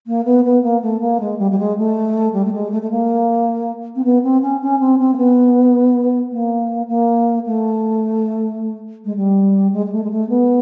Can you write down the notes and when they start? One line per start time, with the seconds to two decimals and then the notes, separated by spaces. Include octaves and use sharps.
0.07 A#3
0.25 B3
0.44 B3
0.63 A#3
0.82 A3
1.00 A#3
1.20 G#3
1.39 G3
1.51 G3
1.58 G#3
1.77 A3
2.33 G3
2.45 A3
2.53 G#3
2.71 A3
2.82 A3
2.90 A#3
3.95 C4
4.04 B3
4.23 C4
4.42 C#4
4.61 C#4
4.79 C4
4.99 C4
5.13 A#3
5.17 B3
6.31 A#3
6.88 A#3
7.46 A3
9.05 G#3
9.16 G3
9.73 G#3
9.86 G#3
9.92 A3
10.03 G#3
10.11 A3
10.29 B3